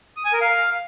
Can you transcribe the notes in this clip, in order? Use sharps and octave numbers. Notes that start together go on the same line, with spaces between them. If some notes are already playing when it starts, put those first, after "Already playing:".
D#6
G#5
A#4
F5